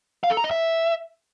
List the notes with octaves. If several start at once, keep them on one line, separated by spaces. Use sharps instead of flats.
F5
A4
A#5
D#5
E5